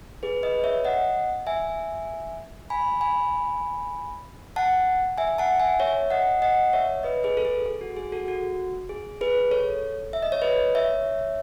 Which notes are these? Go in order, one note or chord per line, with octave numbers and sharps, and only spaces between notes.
G#4 B4
B4 D#5
C#5 E5
D#5 F#5
E5 G#5
G#5 B5
G#5 B5
F#5 A5
E5 G#5
F#5 A5
E5 G#5
C#5 E5
D#5 F#5
D#5 F#5
C#5 E5
B4 D#5
G#4 B4
A4
G#4
G#4
F#4
G#4
F#4 A4
F#4
G#4
G#4 B4
A4 C#5
E5
D#5
C#5
B4 D#5
C#5 E5